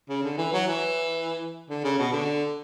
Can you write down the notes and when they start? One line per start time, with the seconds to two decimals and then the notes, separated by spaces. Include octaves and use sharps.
0.09 C#3
0.23 D3
0.38 E3
0.53 F#3
0.67 E3
1.69 D3
1.84 C#3
1.99 B2
2.12 D3